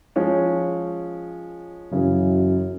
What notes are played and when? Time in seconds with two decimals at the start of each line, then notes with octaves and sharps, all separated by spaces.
0.16 F3 G#3 C#4
1.92 F#2 C#3 E3